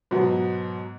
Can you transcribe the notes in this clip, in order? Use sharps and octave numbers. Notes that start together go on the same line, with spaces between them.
G#2 B2 F#3 B3